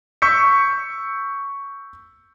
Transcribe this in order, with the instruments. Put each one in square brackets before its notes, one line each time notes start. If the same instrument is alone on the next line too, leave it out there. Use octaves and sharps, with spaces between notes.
[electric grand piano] C#6 E6 G6 B6 C#7